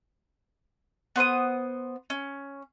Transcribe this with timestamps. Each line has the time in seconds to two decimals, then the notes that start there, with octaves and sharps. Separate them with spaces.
1.16 B3 C5 C6 D#6
2.10 C#4